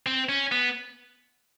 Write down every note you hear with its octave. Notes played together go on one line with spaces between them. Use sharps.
C4
C#4
B3